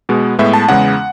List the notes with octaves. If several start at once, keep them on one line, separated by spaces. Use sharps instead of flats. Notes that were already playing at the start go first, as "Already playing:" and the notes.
B2 G#3 B3
A2 G#3 B3 E5
A5
E2 C#3 G#3 B3 F#5